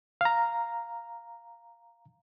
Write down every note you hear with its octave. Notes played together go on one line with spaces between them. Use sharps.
F5 A#5